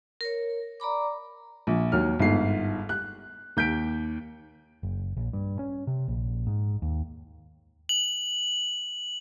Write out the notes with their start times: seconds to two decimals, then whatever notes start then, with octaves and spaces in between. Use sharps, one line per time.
0.21 A#4 C#5
0.80 D5 A#5 B5 D6
1.67 A#1
1.92 D#2 F#3 F6
2.20 G1 G#2 C7
2.89 F#6
3.57 D#2 G6 B6 D7
4.83 F#1
5.17 A#1
5.33 G2
5.59 C#4
5.87 C3
6.08 A#1
6.47 G#2
6.82 D#2
7.89 F#7